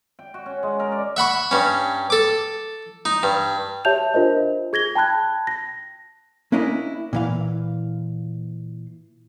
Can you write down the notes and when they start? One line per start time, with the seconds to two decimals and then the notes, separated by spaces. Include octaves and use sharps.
0.19 G5
0.34 F#4
0.46 C#4
0.63 G#3
0.80 A#4
0.92 D5
1.17 E5 F#5 B5 C#6
1.51 G2 C#4
2.10 A4 D6
3.05 D#4
3.23 G2
3.85 G4 C#5 E5 A5 G6 F7
4.14 D4 F4 A#4 C5 D#5
4.73 G#4 G#6 A#6 G7
4.95 G5 A5 B5 F#6 G#6
5.47 A#6
6.52 A#3 C#4 D4 E4 A#4 D#5
7.13 A#2 E3 F5